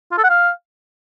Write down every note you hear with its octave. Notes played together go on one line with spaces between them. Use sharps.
F4
A4
F#5
F5